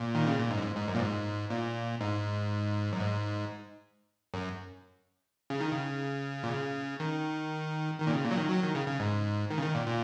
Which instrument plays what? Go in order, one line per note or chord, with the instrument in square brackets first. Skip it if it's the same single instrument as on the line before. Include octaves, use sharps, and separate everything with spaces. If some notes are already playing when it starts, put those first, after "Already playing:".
Already playing: [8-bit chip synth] A#2
D#3
C#3
A#2
G#2
F#2
G#2
G#2
F#2
A#2
G#2
A#2
G#2
F#2
G#2
F#2
C#3
D#3
C#3
A#2
C#3
D#3
D#3
A#2
C#3
A#2
F#3
D#3
F#3
D#3
C#3
C#3
G#2
D#3
C#3
D#3
A#2
A#2